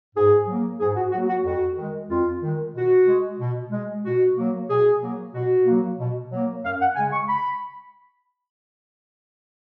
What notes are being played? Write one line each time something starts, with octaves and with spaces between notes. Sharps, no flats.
G#2 G#4
F#3 A#3
G#2 G#4
F#4
F#3 A#3 F#4
F#4
F2 F#4
D#3 G#3
F2 F4
D#3 G#3
B2 F#4
G#3
B2
G#3
B2 F#4
F#3 A#3
B2 G#4
F#3 A#3
B2 F#4
F#3 A#3
B2
F#3 A#3
F#2 F5
F#5
C#3 G#3 G#5
C#6
B5